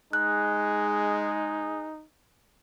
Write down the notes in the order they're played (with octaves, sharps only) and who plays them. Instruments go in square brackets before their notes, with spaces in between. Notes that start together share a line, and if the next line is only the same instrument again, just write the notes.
[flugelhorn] G#3 [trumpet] D#4 [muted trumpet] G#4 [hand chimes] F#6